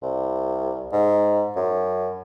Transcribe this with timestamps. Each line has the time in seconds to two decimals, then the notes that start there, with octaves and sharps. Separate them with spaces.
0.03 C2
0.92 G#2
1.56 F#2